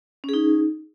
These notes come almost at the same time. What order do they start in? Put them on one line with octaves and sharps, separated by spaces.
C#4 G#4 D#4